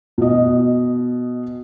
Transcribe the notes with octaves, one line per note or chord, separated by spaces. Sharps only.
B2 D#5